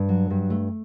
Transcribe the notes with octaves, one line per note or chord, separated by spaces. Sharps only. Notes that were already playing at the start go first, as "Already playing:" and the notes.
Already playing: G2
F#3
G2
A3